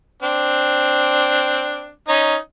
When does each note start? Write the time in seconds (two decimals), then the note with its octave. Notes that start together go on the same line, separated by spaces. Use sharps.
0.22 C4 D4
2.08 C#4 D#4